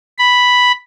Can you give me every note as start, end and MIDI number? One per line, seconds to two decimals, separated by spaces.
0.19 0.72 83